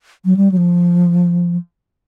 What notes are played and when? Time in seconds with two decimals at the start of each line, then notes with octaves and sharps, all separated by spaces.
0.25 F#3
0.37 G3
0.52 F#3
0.57 F3